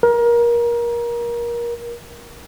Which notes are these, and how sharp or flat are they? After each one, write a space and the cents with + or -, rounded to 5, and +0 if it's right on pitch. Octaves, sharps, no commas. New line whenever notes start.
A#4 +25